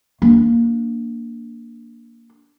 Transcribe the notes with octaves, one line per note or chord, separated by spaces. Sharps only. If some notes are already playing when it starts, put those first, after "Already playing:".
A#3 D4